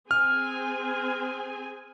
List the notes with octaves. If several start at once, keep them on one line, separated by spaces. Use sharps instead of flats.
C4 G#4 G#5 F6